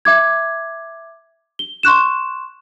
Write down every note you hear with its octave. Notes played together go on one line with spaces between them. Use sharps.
E5 D6 G#6
G7
C6 C#6 F#6 E7